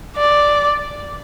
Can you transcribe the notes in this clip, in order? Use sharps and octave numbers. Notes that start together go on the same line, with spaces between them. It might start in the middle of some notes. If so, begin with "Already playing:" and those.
D5